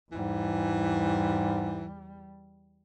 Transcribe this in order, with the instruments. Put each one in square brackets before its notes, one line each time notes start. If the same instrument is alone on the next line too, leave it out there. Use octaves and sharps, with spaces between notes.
[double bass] E2 G3 [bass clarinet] G#2 [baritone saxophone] E3